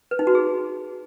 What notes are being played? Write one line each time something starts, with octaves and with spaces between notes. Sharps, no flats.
B4
D#4
F#4
G#4